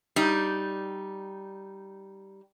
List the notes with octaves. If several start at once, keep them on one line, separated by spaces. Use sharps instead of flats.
G3 D#4